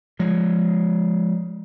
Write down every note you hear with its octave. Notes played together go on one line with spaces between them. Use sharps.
F3 G#3